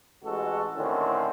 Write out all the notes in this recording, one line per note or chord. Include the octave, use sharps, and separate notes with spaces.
A1 G#3 F#4 A4
A2 D3 D#3 C4 C#4